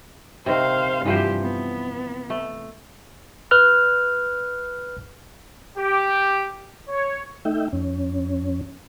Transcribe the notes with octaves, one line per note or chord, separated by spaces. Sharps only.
C3 D#3 C5 F5
G2 E3 F3 G4 C5
B3
A3
B4 F6 F#6
G4
C#5
A3 D#4 E5 G5
F2 C#4